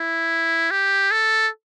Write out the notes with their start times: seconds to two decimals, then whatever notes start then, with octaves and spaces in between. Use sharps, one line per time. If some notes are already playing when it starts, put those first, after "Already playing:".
Already playing: E4
0.71 G4
1.11 A4